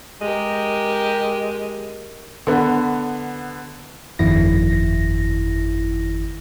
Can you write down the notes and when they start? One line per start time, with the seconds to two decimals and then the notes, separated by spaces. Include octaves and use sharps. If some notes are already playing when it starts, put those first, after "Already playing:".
0.21 G#3 G4 A#4
2.47 D3 B3
4.19 G1 F2 D#3 E4 A#6